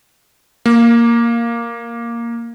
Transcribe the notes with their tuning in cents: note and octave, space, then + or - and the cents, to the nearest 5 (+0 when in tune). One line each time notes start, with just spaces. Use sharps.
A#3 +0